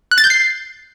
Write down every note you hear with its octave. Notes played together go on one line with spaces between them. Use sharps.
F#6
A6
G6
C7